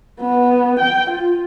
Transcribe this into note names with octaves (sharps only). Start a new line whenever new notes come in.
B3
G5
F4